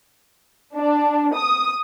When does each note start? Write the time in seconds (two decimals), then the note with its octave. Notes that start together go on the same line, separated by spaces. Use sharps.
0.76 D4
1.35 D#6